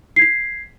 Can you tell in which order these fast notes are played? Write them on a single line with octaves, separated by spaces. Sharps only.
C7 G#6 B6